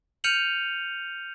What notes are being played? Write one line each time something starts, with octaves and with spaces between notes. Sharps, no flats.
F6 G6 C#7 D#7 F7 F#7